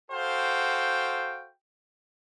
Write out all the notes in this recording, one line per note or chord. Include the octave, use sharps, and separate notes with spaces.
F#4 A4 C5 F5 G5